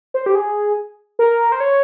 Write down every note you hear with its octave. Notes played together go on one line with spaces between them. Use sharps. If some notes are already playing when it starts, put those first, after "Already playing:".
C5
G4
G#4
A#4
C5
C#5